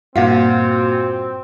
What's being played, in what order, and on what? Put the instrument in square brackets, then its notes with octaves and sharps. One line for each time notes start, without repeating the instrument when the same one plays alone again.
[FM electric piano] G2 F#4 [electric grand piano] A#2 F4 [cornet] C4 [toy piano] F5 F#5